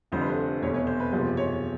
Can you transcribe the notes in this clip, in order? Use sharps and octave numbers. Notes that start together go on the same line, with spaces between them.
F1 F2 D3 G3 C5
B4
C5
F1 E2 B2 C#5
C#5
C5
B4
F#1 E2 C3 F3 C5
C#5